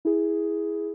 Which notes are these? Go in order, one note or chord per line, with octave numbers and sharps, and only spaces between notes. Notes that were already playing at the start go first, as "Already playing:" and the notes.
E4 G#4